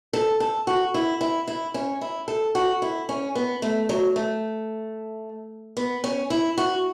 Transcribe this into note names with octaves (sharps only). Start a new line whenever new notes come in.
A4
A4
F#4
E4
E4
E4
C#4
E4
A4
F#4
E4
C#4
B3
A3
F#3
A3
B3
C#4
E4
F#4